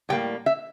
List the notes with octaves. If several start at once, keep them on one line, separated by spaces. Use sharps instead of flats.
A2 G3 A#3 G5
E5